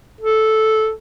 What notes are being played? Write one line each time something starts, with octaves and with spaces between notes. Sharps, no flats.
A4